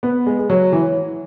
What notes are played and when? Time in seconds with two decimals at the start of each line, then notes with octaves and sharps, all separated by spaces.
0.03 B3
0.26 G#3
0.39 G#3
0.50 F#3
0.72 E3